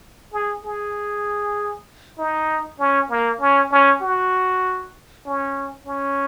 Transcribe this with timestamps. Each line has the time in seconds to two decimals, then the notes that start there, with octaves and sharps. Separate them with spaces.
0.33 G#4
0.64 G#4
2.18 D#4
2.79 C#4
3.10 A#3
3.40 C#4
3.71 C#4
4.02 F#4
5.26 C#4
5.86 C#4